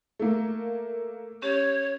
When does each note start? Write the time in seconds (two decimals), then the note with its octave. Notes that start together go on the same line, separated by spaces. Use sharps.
0.19 A3 A#3
1.42 C#4 G4 C#5